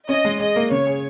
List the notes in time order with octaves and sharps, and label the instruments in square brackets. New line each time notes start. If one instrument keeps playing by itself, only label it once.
[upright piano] C#4 [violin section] D#5
[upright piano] G#3
[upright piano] G#4 [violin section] D#5
[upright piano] A#3
[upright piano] C#3 [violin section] C#5
[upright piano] G#4